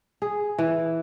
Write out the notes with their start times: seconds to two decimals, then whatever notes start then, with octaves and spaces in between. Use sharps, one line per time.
0.22 G#4
0.59 E3